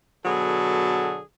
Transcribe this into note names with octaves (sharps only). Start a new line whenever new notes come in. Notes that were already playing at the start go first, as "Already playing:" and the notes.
B2 D3 F#3 G#4 A4